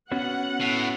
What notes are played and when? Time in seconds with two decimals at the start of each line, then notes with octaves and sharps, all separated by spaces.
0.12 B3 C#4 F#4 F#5
0.60 A2